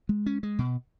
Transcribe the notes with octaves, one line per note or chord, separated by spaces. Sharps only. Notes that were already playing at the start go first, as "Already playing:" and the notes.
G#3
C#4
G#3
B2